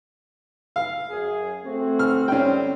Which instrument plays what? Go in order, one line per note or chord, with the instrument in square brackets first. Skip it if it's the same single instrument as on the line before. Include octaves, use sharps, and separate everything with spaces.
[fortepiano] F5
[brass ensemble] F#2 G#4
A3 C4 F#4
[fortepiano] F6
[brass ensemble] D3 G3 C4 [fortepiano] C#4 G5